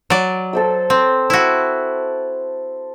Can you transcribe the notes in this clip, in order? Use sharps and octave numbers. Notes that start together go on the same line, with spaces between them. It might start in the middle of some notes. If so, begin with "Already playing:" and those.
F#3 D5
A4 C5 E6
C4
E4 F#4